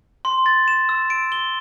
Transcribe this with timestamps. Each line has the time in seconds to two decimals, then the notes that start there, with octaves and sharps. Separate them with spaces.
0.25 C6
0.46 A6
0.68 E7
0.89 E6
1.10 D7
1.32 G7